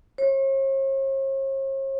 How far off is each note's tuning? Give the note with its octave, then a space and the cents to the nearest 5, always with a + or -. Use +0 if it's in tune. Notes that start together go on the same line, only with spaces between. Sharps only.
C#5 -45